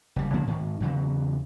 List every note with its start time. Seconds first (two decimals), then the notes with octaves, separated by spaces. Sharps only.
0.16 F#1 G3
0.33 C#3 F3 A#3 C#4
0.47 G#2 D#3
0.80 E2 C#3 F#3